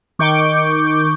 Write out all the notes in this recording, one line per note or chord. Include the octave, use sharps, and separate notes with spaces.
D#3 C#6 D6 G6